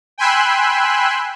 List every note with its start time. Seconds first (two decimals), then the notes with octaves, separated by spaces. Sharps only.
0.18 G5 G#5 B5 C6 E6 F#6